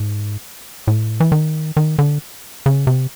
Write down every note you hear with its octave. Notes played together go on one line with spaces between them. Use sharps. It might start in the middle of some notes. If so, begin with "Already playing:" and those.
Already playing: G#2
A2
E3
D#3
D#3
D3
C#3
C3